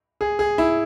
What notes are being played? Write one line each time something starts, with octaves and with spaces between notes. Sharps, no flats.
G#4
G#4
E4